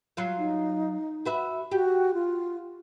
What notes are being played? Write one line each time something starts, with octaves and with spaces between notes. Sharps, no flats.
F#3 F4 F5
D#4
F#4 B4 E5
F#4 G4
F4